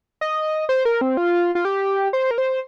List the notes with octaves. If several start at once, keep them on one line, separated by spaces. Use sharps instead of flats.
D#5
C5
A#4
C4
F4
F4
G4
C5
A#4
C5